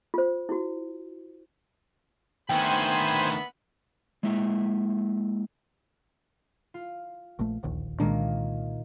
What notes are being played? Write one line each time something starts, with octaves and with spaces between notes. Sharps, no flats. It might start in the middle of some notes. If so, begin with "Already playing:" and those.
F4 C5
E4 F#4
D2 D#3 B3 C5 E5 G5 G#5 B5
G#3 A#3 E4 E5
F4
A#1 A3
D1 A#1 D#2
C2 A#2 D#3 G#3 A#3 D4